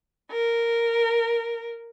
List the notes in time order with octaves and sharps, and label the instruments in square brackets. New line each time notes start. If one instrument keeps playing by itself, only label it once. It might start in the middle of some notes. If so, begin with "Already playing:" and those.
[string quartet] A#4